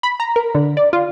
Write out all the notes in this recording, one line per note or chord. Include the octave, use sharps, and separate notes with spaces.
B5
A#5
A#4
D3
D5
F4